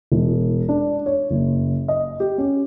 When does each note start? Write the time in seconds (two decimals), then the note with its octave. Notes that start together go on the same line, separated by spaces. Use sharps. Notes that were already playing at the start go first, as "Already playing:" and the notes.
0.12 E1
0.69 D4
1.06 C#5
1.31 F#1
1.88 D#5
2.20 G4
2.38 C#4